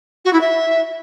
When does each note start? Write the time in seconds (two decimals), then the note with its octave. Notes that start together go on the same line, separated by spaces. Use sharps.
0.25 F#4
0.33 E4
0.41 E5